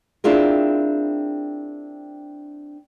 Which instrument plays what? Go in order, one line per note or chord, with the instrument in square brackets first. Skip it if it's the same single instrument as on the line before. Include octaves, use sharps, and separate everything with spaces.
[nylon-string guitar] C4 D4 E4 F4 G#4 A#4